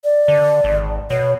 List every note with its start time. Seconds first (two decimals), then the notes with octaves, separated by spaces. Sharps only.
0.04 D5
0.28 D3
0.64 G#1
1.10 B2 C#5